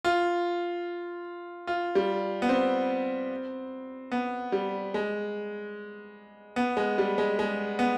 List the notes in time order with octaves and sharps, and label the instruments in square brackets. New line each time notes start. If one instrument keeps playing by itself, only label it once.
[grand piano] F4
F4
G3
B3
C4
B3
G3
G#3
B3
G#3
G3
G#3
G#3
B3